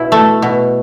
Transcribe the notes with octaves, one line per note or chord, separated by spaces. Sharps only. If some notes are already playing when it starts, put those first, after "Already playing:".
Already playing: B2 E4
A3
B2